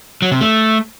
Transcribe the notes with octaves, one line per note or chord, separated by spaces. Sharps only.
F#3
C3
A3